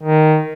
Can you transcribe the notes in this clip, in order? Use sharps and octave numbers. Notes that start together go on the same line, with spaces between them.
D#3